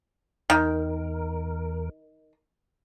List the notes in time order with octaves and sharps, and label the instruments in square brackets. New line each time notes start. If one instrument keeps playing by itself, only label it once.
[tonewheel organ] E2 A#4 [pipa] D#3